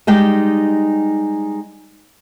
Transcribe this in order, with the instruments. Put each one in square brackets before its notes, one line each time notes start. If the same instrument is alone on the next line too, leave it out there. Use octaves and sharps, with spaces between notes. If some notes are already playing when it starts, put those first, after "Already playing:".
[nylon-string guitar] G3 G#3 D#4 G4 G5